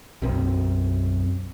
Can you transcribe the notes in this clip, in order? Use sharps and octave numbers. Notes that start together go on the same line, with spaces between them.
B1 F#2 C4